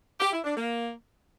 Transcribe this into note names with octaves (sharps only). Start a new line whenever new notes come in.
G4
E4
D4
A#3